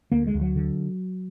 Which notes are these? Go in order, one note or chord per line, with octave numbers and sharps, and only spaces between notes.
D2 A#3
G#3
D2
F#3
D3